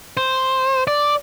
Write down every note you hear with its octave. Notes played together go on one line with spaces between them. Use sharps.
C5
D5